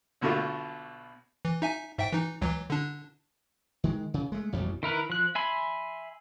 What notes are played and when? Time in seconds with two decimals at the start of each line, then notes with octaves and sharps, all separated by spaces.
0.21 B1 B2 D3 A3 F4
1.45 E3
1.62 D#4 E5 G#5
1.98 G#2 E5 G5
2.12 E3 D#4
2.42 C#2 E3 F#3
2.70 D3 D4
3.84 D#3 G#3
4.14 C#3
4.32 G#3 A3
4.52 A1 F2 B2 G3
4.83 D#3 E4 A#4 B4
5.10 F3 F#6
5.35 E5 G#5 B5 C6